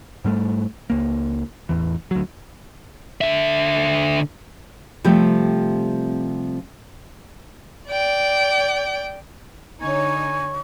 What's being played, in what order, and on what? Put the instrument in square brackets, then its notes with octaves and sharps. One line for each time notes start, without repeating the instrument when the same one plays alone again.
[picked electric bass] G#2 G3 A3
C#2 A#3
A1 E2 E3
D2 F#3
[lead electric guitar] D3 E5
[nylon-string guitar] C3 F3 G3 A3 C4
[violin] D5 G5
[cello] D3 [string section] D#4 C#5 [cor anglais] G#5 [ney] C#6